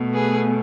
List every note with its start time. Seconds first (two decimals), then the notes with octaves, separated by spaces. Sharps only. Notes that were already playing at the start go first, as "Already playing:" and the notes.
Already playing: B2 A3
0.14 G#4 B4